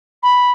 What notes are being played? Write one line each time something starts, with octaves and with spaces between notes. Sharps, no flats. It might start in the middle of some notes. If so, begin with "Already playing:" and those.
B5